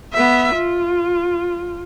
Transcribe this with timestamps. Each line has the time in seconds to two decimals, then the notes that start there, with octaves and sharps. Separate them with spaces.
0.13 B3 E5
0.56 F4